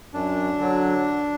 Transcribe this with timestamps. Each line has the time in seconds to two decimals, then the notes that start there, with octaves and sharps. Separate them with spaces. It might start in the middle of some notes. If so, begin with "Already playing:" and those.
0.14 F#2 D4
0.58 D3 F#3